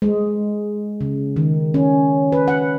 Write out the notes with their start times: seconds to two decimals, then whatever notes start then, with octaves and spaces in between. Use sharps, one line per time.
0.02 G#3
1.01 C#3
1.36 D#3
1.74 C#4
2.32 B4
2.48 F#5